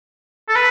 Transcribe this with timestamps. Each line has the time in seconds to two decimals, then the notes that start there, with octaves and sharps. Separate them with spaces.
0.49 A4
0.55 B4